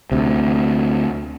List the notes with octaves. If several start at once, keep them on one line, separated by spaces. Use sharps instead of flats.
D2 C3